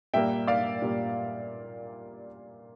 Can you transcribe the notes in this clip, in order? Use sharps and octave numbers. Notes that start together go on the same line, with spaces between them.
A#2 G3 A#3 E5 G5
D5 F5
A#2 G3 A#3